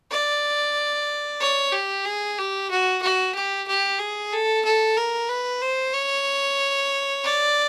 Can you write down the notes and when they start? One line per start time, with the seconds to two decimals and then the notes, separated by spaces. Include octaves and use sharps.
0.11 D5
1.40 C#5
1.73 G4
2.05 G#4
2.38 G4
2.70 F#4
3.02 F#4
3.35 G4
3.67 G4
4.00 G#4
4.32 A4
4.65 A4
4.97 A#4
5.29 B4
5.62 C5
5.94 C#5
7.24 D5